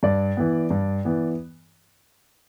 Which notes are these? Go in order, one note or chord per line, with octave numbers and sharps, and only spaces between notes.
G2 D5
E3 B3
G2
E3 B3